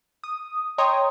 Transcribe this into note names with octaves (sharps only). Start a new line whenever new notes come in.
D#6
C#5 D#5 G5 A#5 C6 D#6